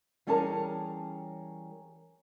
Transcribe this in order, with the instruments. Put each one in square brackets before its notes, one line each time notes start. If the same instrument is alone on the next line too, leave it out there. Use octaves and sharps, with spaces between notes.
[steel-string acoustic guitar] E3 G3 C#4 G#4 A#4 A5